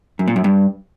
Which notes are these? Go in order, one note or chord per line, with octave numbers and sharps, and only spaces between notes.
F#2
A#2
F#2
G2